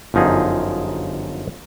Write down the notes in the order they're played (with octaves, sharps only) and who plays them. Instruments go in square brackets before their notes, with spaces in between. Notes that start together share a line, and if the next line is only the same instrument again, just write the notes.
[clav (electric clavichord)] G1 F#2 F3 D#4 G#4